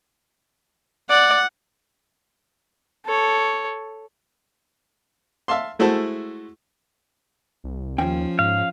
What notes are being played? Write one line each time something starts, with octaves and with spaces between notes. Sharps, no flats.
D5 F#5
A4 C#5
E5 F5 A5 C6
G#3 A3 E4 F#4 C5 A5
C2
D#2 F3 C#4 G5
G#2 F5